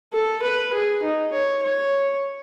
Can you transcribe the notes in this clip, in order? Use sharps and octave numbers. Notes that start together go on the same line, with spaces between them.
A4
B4
G#4
D#4
C#5
C#5